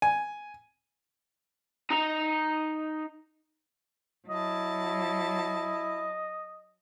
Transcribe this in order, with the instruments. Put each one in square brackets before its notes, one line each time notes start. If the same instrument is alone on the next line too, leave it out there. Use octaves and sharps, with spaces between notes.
[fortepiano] G#5
[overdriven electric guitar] D#4 A#5
[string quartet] F#3 A5 [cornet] E4 [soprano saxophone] D#5